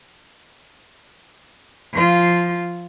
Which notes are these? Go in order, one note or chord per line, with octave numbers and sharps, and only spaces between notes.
F3 F4